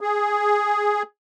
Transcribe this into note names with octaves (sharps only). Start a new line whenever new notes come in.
G#4